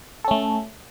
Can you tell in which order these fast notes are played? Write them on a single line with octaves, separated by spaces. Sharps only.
A4 C#4 A3